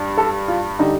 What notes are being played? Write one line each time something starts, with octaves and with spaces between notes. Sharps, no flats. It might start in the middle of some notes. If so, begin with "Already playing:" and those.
Already playing: G2
A4
F4
D3 G3 D#4